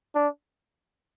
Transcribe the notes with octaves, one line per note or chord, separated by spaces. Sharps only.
D4